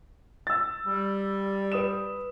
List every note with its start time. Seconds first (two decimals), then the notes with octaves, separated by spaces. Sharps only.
0.47 E6 A6
0.86 G3
1.72 B4 D#6 E7